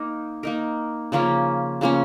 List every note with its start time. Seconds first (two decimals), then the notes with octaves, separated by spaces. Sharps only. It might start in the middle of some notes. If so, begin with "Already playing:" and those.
Already playing: A#3 D#4 A#4
0.43 A#3 D#4 A#4
1.12 C#3 F3 A#3 C#4
1.81 C#3 F3 A#3 C#4